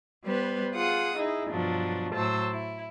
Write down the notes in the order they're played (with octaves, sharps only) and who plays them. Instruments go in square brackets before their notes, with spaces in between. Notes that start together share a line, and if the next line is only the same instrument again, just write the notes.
[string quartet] G3 B3 B4 C5
F4 G#4 F#5 D#6
D#4 E4 G#4
G2 B2 F3 F#3 D4
A2 F#3 C5 A5 E6
E4